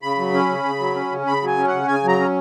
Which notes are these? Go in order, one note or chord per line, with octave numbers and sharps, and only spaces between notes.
C#3 B5
F#3
C#4
C#3
C#3
F#3
C#4
C#3
C#3 B5
F#3 G#5
C#4
C#3 F#5
C#3 G#5
F#3 A#5
C#4